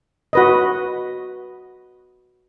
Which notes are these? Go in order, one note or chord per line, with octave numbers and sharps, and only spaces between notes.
F#4 B4 D#5